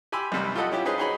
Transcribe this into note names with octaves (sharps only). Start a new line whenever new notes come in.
G4 G#5 B5 C6 E6
B1 F#2 C3 G3
F4 G4 A4 D#5 F#5
C#4 E4 F4 G4
C#4 D#4 G#4 B4 C5
D#4 F#4 G#4 C#5 B5